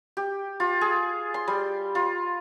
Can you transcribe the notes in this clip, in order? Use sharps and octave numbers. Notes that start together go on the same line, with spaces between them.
G4
F4
G#4
C6
G3
F4